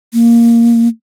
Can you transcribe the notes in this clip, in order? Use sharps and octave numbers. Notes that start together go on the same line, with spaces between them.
A#3